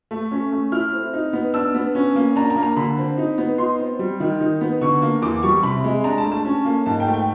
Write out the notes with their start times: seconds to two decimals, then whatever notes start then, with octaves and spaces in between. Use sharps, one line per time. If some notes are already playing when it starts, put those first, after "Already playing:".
0.11 A3
0.31 C#4
0.52 A3
0.72 E4 F6
0.92 C4
1.14 D#4
1.33 B3
1.54 D4 E6
1.75 B3
1.95 C#4
2.15 A#3
2.36 D4 A#5
2.50 A#5
2.56 A#3
2.63 A#5
2.77 D3 B5
2.97 C4
3.18 D#4
3.38 B3
3.58 D#4 C6
3.79 C4
3.99 G3
4.20 D#3
4.41 D#4
4.61 B3
4.81 D3 C#6
5.02 A#3
5.22 E2 D6
5.43 G3 C#6
5.63 C3 B5
5.84 G#3
6.04 D4 A#5
6.18 A5
6.25 A3
6.32 A5
6.45 C#4
6.65 A#3
6.86 G#2 A5
7.00 G5
7.07 A3
7.14 G5